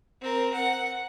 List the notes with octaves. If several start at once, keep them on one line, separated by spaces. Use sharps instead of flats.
C4 A#4
F#5